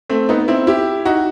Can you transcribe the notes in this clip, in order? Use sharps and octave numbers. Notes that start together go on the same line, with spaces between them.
A3 C4
B3 D#4
C4 E4
E4 G4
D#4 F#4